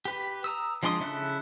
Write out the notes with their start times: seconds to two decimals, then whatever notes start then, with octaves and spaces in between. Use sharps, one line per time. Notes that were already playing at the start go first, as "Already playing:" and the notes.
0.05 G4 B4
0.44 A#5 D#6 E6
0.83 F3 G#3 D4 C6 D#6
1.00 C#3 E4 A4 F#6